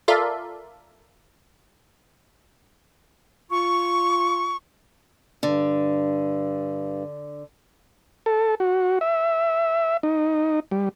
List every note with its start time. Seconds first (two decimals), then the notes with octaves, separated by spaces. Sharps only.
0.08 F4 A4 A#4 D5 E5 F5
3.51 F4 C#6
5.43 G2 D3
8.26 A4
8.60 F#4
9.01 E5
10.03 D#4
10.71 G3